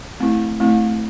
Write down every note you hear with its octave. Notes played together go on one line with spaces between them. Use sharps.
A3 C4 E4
A3 C4 E4